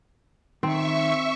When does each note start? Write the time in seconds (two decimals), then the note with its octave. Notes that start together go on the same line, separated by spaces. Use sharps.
0.63 D#3 C4 E5 C#6